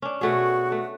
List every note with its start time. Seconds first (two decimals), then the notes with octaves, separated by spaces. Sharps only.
0.02 C#4 D4
0.21 B2 A3 F#4 G#4
0.72 A3